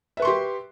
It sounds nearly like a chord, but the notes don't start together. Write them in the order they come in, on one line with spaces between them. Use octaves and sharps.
E5 B4 C#6 C6 G4